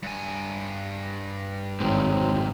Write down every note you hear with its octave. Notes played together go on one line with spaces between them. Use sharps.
G2 G#5
G#1 F2 G#2 C3 F#3 C4